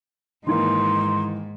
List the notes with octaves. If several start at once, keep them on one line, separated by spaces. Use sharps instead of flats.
G#2 D#3 E3 A#3 D#4 C6